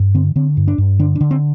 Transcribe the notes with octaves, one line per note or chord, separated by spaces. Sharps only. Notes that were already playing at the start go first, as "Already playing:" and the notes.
Already playing: G2
D3 C4
D3 C4
G2
D4
G2
D3 D4
D4
D3
C4